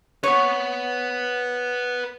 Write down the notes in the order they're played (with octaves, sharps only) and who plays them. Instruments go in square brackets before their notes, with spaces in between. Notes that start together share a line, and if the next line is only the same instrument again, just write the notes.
[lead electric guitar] B4 F#5 [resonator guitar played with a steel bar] C#5